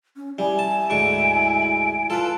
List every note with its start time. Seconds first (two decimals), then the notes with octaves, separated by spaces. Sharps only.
0.16 C#4
0.39 G3 E4 G#5
0.59 A5
0.90 D2 G#2 C#6 D7
2.10 F4 A4 B4 A5